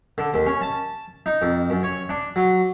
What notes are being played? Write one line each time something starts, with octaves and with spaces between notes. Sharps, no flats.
D3
D#2
C#4
A5
D#4
F2
F#2
C#5
D4
F#3